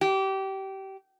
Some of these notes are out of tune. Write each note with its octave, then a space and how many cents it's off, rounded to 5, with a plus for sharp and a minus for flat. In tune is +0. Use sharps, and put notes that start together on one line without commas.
G4 -25